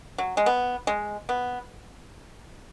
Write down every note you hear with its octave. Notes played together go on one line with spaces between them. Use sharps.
F#3
G#3
B3
G#3
B3